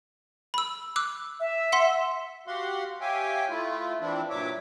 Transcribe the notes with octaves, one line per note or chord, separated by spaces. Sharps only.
B5 E6
D6 E6 F#6
E5
F#5 C6 B6
F#4 G4 F5 F#5 C6
G4 C#5 E5 F5 G5 G#5
A3 E4 F4
E3 F3 C4 D4 E4
G2 A#2 F#3 C#5 E5 D6